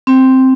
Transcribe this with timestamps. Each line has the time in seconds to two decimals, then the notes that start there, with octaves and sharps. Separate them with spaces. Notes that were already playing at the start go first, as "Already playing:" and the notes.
0.07 C4